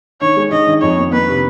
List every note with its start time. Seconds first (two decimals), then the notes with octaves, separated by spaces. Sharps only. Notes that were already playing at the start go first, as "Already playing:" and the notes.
0.21 D#3 C#5
0.37 G#3
0.51 D#3 D#5
0.67 D#3
0.82 F2 C#5
0.97 A#3
1.12 A#3 B4
1.28 C3